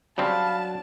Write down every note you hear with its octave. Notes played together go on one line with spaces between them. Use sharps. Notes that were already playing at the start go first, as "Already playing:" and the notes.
C#3 F#3 G3 C4 D4 F5 A5 B5